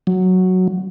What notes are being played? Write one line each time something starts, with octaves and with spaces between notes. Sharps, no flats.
F#3